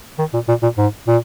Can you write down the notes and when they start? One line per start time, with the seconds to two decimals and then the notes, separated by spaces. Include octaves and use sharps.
0.19 D#3
0.34 A#2
0.48 A#2
0.63 A#2
0.78 G#2
1.07 A#2